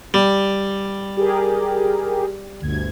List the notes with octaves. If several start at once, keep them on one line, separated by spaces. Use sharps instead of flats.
G3
G4 G#4 A#4
G1 D2 G#6